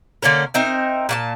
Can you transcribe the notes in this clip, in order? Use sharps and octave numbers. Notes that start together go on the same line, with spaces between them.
D3 A#3 C#4 A#4
C4 D#4 A#4 E5
A#2 F#4 A5